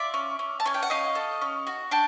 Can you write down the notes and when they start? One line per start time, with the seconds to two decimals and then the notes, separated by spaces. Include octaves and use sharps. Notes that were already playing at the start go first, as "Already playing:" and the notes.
Already playing: F4 D5 E5
0.14 C#4
0.39 C#4
0.60 A5
0.66 C#4 G#5
0.74 G5
0.83 F#5
0.90 C#4 D#5 F5
1.15 A4
1.41 C#4
1.67 F#4
1.91 D4 G5 A5